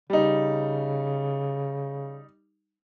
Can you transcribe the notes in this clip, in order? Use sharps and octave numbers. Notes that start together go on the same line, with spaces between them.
C#3 G3 D#4